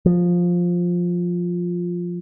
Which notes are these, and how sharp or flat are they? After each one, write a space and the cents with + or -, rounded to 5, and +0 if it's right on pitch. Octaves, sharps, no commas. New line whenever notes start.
F3 +10